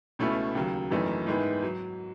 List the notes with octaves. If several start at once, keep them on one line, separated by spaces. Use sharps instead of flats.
C#2 B2 A3 C#4 E4
D#2 C#3 F#3
G#1 F#2 E3 A3 D#4
G#2 D#3 G#3 B3 E4
F#3